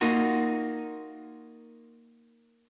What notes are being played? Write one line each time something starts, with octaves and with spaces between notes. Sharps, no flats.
A#3 D#4 F4 F#4